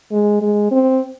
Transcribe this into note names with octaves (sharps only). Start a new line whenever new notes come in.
G#3
G#3
C4